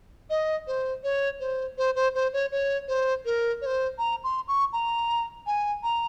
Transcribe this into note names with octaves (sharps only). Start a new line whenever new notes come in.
D#5
C5
C#5
C5
C5
C5
C5
C#5
C#5
C5
A#4
C#5
C5
A#5
C6
C#6
A#5
G#5
A#5